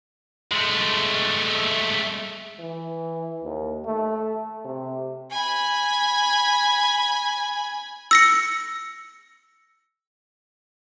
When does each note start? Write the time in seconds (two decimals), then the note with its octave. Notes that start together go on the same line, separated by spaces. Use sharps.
0.52 G#3 A3
2.59 E3
3.44 D#2
3.85 A3
4.65 C3
5.31 G#5 B5
8.11 E6 A#6 C#7